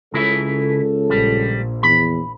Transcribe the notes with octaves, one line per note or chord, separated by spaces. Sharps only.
C#2 C#3 C#4 E4 A4 E5
A#1 G3
E2 B5